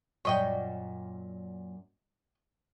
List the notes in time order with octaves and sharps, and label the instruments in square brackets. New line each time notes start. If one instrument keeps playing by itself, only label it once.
[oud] F#2 A#2 [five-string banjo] C#5 D#5 G5